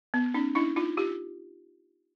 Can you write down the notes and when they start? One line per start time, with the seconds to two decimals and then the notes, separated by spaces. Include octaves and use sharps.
0.14 B3
0.34 C#4 D#4
0.55 D4 E4
0.76 D#4 F4
0.97 F4 G4